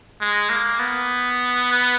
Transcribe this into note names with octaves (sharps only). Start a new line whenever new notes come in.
G#3
A#3
B3